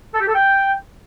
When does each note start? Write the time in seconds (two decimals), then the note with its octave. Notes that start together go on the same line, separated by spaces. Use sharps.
0.14 A4
0.21 G4
0.28 A4
0.35 G5